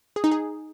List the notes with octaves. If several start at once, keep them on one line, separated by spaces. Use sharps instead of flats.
G#4
D#4
G#4